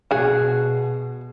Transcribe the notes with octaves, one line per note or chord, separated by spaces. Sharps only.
B2 F#4 G#4